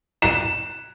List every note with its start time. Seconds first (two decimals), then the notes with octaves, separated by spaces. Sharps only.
0.22 E7